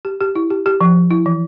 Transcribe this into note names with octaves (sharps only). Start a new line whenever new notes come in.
G4
G4
E4
G4
G4
F3
F3
E4
E3